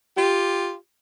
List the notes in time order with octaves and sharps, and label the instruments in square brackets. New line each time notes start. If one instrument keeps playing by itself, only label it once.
[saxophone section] F4 G4